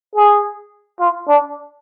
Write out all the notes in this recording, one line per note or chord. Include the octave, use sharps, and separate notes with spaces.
G#4
F4
D4